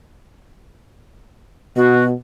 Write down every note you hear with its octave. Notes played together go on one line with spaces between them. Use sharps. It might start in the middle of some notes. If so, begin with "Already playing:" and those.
B2 F#4